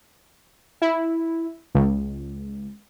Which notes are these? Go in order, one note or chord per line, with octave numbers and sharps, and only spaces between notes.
E4
C#2